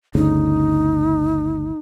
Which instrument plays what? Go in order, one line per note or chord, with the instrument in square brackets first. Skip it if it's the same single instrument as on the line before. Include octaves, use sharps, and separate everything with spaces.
[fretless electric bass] G1 D2 C#3 [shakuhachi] D#4